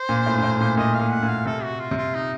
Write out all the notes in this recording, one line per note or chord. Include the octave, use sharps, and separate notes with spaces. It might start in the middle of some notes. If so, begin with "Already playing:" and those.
Already playing: C5
A#2
A2
A#2
A2
A#2
A#2 D#5
F5
A#2
F#5
A#2
F5
C3 A4
F#4
F4
C3
F4
D#4